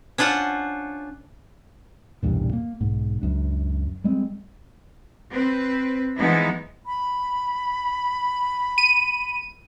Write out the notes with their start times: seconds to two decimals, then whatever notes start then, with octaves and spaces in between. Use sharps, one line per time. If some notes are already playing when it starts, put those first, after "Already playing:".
0.18 C#4 D4 F4 C5 F#5
2.23 B1 E2 G2 A#2
2.53 A#3
2.81 B1 G#2
3.21 C#2 F#2 D4
4.04 G3 G#3 C4
5.30 C4 B4
6.18 E3 F3 G#3 B3 D#4 E4
6.86 B5
8.78 D#7